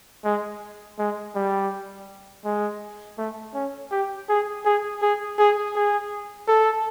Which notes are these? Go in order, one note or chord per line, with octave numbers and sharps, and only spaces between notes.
G#3
G#3
G3
G#3
A3
C#4
G4
G#4
G#4
G#4
G#4
G#4
A4